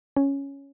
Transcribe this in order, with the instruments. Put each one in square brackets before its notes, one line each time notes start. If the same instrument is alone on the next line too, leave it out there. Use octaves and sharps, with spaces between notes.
[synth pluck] C#4